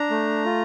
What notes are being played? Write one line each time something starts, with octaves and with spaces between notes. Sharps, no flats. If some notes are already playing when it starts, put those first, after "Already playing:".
Already playing: D4 A#5
A3
F4